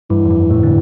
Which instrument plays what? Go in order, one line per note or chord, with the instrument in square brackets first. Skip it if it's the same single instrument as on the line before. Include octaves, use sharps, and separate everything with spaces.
[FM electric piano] G2 [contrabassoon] E3
[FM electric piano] F2
G2
A2
D3